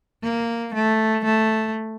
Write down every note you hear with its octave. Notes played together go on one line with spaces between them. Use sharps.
A#3
A3
A3